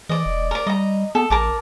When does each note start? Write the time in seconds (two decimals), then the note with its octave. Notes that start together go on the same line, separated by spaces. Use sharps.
0.09 E3 D5 D#5
0.26 E1
0.51 A#4 D5
0.67 G3 D#5 A#5
1.15 B3 A4
1.30 A1 A#4 A5 D6